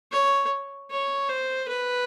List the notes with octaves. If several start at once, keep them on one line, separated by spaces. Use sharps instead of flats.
C#5
C#5
C5
B4